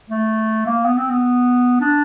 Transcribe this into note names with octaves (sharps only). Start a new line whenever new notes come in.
A3
A#3
B3
C4
B3
D4